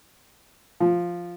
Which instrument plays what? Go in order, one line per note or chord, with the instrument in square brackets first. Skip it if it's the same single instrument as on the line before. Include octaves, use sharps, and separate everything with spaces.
[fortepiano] F3